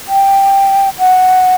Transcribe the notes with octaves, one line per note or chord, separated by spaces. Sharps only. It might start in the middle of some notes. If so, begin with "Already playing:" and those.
G5
F#5